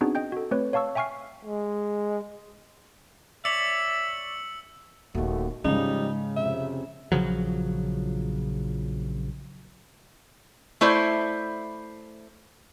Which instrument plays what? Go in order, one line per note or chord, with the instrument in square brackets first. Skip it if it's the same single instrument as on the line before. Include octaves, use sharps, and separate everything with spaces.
[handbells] B3 C4 D4 D#4 F#4 G#4
D#5 G5 G6
F#4 A4
A3 C4 B4 C#5
C#5 F5 A5 C#6 E6
E5 G5 G#5 C#6 F6 C7
[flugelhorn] G#3
[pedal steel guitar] C#5 D5 [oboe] E5 [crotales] E6 C#7 F#7
[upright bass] D#1 C#4 [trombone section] D#2 A3 F#4
[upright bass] G#2 G#3 [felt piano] C#3 [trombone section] F3 G3 [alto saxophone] D#4
[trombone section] F2 C3 [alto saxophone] E5
[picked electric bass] A#1 C#3 F3 F#3
[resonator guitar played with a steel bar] A3 E4 C5 D5